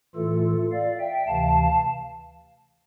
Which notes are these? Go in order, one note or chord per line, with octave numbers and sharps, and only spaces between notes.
A2 E3 A3 F4 A4
D5 F5
E5 G5
D2 C3 E3 F5 A5